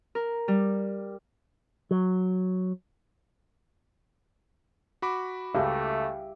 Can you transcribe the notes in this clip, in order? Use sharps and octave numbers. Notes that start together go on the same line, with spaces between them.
A#4
G3
F#3
F#4 B5 D6
C#2 A3 G4 E5